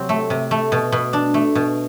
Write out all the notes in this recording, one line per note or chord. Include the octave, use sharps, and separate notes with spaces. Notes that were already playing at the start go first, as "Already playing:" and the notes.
Already playing: C3 F#3 C4
A3
C3
A3
B2
B2
D4
A3
B2